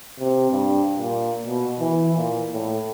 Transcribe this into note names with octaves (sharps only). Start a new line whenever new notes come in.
C3
G2
A#2
B2
E3
A#2
A2